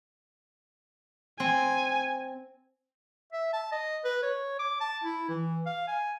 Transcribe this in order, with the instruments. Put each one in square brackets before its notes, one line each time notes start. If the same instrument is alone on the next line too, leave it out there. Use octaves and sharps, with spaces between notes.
[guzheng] C4 [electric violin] G#5
[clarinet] E5
A5
D#5
B4
C#5
D6
A5
E4
E3
F5
G#5